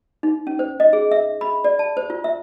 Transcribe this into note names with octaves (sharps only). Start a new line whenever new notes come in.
D#4
C#4
C5
D#5
G#4
E5
B5
D5
A5
C5
F4
E5